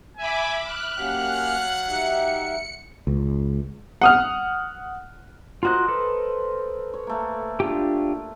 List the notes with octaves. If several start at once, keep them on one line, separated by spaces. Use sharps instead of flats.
E5 G#5 B5 D6
F6 F#6
F#3 A#3 C#4 G4 F5 F#5
D#4 G4 E5 C#7
C#2
F#5 D#6 F6
F4 F#4 A#4 C5 D#5 F#6
A4 B4
C#5
A3 A#3
D4 F4 G4